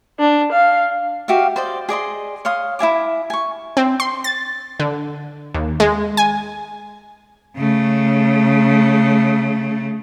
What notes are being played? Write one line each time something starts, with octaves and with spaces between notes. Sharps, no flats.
D4
F5
F#4 G4 E5 F5
C5 D5 D#5
G#4 D5 D#5 C6
C#5 F5 C6 D#6
E4 E5 G#5 D6
G#5 C#6
C4
C6
A6
D3
D#2
G#3
G#5
C#3 A3